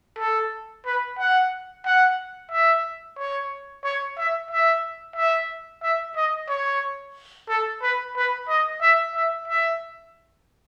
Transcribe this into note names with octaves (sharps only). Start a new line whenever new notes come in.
A4
B4
F#5
F#5
E5
C#5
C#5
E5
E5
E5
E5
D#5
C#5
A4
B4
B4
D#5
E5
E5
E5